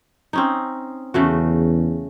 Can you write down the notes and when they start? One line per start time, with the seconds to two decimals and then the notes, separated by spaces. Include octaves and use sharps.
0.33 C4 C#4 D#4
1.14 E2 C#3 A3 F#4